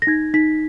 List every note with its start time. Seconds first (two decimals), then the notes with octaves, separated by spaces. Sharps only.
0.02 A#6
0.07 D#4 G#6
0.34 D#4 B6